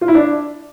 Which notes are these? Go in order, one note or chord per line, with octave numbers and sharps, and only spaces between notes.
F4
E4
D4